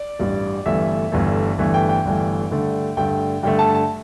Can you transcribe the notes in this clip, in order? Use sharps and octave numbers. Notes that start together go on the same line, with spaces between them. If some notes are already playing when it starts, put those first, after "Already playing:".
Already playing: D5
A1 G2 G3
G1 G2 E3 A3 E5
G1 G2 E3 A3
G1 G2 E3 A3
G5
G5
G1 G2 E3 A3
G2 D3 A3
G2 D3 A3 G5
G2 D3 A3 G5
A5
A5